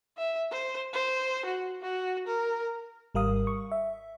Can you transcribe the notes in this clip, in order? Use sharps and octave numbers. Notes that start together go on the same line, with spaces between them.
E5
C5
C5
F#4
F#4
A#4
G#1 G3 A#4 F5 D#6
C#6
E5